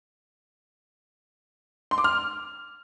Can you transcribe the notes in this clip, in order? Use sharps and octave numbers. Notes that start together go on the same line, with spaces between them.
C6
D6
F6